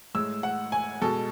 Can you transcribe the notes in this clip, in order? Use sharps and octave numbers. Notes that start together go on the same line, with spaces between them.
A2 G#3 E6
F#5
G#5
B2 G#3 A4